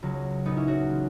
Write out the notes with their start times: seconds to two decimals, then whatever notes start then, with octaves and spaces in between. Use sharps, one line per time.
0.03 C#2 C#3 F#3
0.45 A#2 F#3 A#3 B3 D#4
0.57 C#4 E4
0.67 D#4 F#4
0.90 C#3 E3 G#3